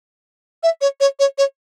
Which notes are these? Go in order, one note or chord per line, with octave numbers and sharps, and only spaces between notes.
E5
C#5
C#5
C#5
C#5